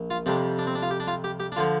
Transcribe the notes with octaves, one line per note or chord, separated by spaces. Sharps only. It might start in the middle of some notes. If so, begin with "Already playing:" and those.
Already playing: A#1
F4
F2 C3 G3 D4
D4
C4
D4
F4
G4
D4
F4
G4
G4
D4
D3 F3 F4